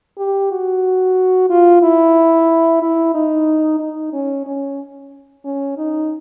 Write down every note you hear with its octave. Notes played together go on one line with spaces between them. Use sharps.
G4
F#4
F4
E4
E4
D#4
D#4
C#4
C#4
C#4
D#4